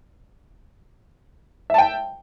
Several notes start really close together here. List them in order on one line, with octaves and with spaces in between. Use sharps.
E5 A5 G5